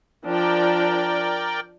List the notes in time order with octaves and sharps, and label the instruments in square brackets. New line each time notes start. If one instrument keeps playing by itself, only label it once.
[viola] F3 D4 [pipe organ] A#4 D5 G5